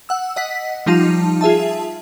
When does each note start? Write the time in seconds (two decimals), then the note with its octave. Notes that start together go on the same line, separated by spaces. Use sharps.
0.09 F#5 E6
0.36 D#5 F#5 B6
0.86 F3 G3 D#4 F4 A5
1.41 F4 G#4 E5 A5